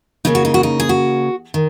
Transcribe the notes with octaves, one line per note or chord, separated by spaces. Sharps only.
C#3 A#3 C#4 D#4
F#4
D#4
F#4
D#4
G#4
F#4
D#3